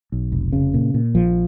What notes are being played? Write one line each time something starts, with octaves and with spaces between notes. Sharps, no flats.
B1
F1
C#3
A#2
A#2
A#1 F3